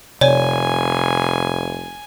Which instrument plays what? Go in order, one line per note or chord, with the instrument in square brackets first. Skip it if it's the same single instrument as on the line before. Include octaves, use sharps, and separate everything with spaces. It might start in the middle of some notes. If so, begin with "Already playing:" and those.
[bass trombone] F1 [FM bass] C3 [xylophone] C#5 D5 [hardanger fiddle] G#5